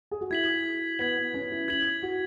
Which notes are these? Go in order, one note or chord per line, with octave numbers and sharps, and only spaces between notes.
G#4
F#4
E4 G#6 B6 F#7
B3 G#6 B6 F#7
B3
C#4
E4
E4 G#6 B6 F#7
F#4